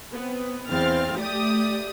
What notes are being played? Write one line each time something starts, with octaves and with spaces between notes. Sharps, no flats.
B3 C4
E2 C4 F5 F6 A6
A3 G4 D5 D#6